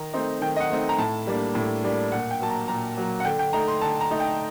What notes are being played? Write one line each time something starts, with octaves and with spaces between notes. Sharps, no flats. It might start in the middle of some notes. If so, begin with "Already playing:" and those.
Already playing: D#3 A#5
A3 C4 D#4
D#3 G5
D#5
F#5
A3 C4 D#4
A#5
A2 A5
G3 A#3 D4
A2
G3 A#3 D4
A#2 F#5
G5
F#3 A#3 A5
A#5
A#2 A#5
F#3 A#3
F#5
D3 G5
G5
A3 D#4 A#5
C6
D3 A5
A#5
A3 D#4
G5